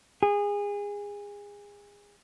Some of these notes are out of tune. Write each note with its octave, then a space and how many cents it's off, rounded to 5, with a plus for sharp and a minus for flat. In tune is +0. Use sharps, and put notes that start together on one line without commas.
G#4 -25